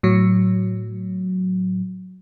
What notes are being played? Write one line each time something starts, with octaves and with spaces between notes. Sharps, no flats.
A2 F#3